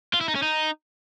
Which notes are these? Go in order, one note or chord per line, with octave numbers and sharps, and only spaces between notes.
F4
E4
D#4
C#4
D#4